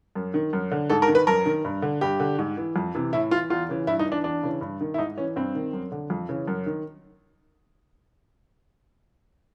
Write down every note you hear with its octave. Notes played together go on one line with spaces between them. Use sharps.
F#2
D#3
F#2
D3
G#2 A4
A#4
D#3
B4
F#2 A#4
D#3
G2
D3
G2 G4
D3
G#2
E3
F2
C3 E3
A2 E4
E3 F4
E2 F4
C#3 E3
G2 E4
D#4
E3
D4
E2 D4
C#3 E3
G2
D#3
E4
G#2 D#4
E3 C#4
G2 C4
D#3
F#2
D3
F2
C#3 E3
F#2
D#3